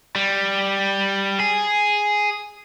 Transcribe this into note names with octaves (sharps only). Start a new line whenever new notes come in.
G3
G#4